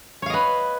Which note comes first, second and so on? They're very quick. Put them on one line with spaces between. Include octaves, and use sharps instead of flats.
C#5 F5 D#5 B4